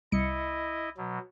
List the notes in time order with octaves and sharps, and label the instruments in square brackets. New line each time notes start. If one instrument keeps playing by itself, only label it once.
[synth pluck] C2 C#7 [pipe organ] E4 D#5
[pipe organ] B2 F#3